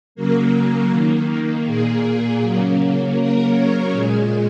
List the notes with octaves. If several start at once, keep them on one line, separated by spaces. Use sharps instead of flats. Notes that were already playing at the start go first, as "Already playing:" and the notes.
C#3 F#3 A#3 A#4
D#3 A#3
A#2 A#3 G#4
C#3 F#3 A#3
C#3 F#3 A#3 A#4
C#5
A#2 G#3 G#4